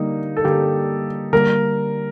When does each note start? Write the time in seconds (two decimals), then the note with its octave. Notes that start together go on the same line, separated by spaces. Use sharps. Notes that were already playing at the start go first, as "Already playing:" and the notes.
Already playing: D3 G3 A#3 D#4
0.37 A4
0.44 D3 G3 A#3 G4
1.33 D3 G3 A#3 A#4